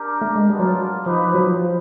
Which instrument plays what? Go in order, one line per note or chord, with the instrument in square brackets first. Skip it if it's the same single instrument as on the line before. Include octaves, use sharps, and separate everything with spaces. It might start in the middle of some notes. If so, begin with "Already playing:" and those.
Already playing: [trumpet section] D4 G4 A#4
[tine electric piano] A3
G#3
[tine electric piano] G3 [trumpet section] B3 D4 F4 A#4
[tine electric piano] F#3
[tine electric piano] F3 [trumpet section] D#4 G4 B4
[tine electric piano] F3
F#3
F3